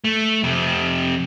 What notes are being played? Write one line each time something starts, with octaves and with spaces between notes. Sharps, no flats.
A3
F2 C3